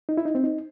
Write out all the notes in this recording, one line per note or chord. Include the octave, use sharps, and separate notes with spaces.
D#4
E4
D#4
C4
D#4